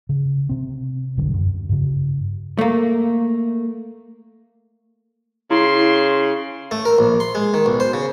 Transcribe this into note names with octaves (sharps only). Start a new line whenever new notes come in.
C#3
C3 C4
E1 B1 G2 D3
F#2
G2 C#3
A3 A#3
C#3 E4 C6
A3
A#4
A#1
C6
G#3
D#3
B1
C5
C#3